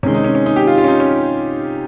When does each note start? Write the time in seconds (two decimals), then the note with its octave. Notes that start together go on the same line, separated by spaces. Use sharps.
0.03 C3 D#3 G#3 C#4
0.14 D#4
0.24 C#4
0.35 C#4
0.46 D#4
0.56 G4
0.67 F4
0.78 F4
0.84 C#4
0.88 D#4
1.00 C#4